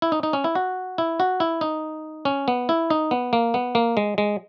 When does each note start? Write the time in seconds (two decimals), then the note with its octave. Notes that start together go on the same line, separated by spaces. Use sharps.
0.02 E4
0.12 D#4
0.23 D#4
0.33 C#4
0.44 E4
0.55 F#4
0.98 E4
1.20 F#4
1.40 E4
1.61 D#4
2.25 C#4
2.48 B3
2.69 E4
2.90 D#4
3.11 B3
3.33 A#3
3.54 B3
3.75 A#3
3.97 G#3
4.18 G#3